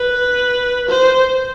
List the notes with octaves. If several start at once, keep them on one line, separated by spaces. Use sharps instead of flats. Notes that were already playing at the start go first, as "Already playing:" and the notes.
Already playing: B4
C5